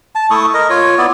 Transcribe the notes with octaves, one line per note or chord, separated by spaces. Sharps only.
A5
A3 E4 C#6 D#6
A#4 D#5
F4 C#5
B3 E4 D5